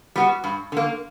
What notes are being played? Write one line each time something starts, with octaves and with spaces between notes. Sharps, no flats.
G3 B3 F#4
G2
D3 A#3